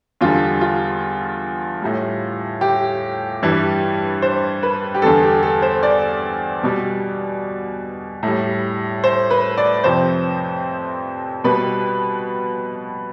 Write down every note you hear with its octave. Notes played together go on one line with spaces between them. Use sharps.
E2 D3 G3 F4
F4
A2 G3
G4
G2 E3 G3
C5
B4
G4
E2 D3 G3 A4
G4
A4
C5
D5
B2 G3
A2 G3
C5
B4
D5
F2 C3 F3 C5
B2 G3 B4